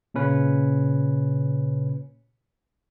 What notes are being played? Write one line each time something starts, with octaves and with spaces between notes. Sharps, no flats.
A#2 C#3 C#4 B4